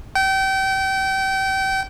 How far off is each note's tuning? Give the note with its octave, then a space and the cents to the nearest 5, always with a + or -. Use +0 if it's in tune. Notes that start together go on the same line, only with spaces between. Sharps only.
G5 -30